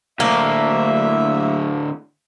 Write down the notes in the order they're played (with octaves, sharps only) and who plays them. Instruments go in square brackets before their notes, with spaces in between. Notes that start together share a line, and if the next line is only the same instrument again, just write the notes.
[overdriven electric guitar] D2 A2 [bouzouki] A#3 [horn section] E5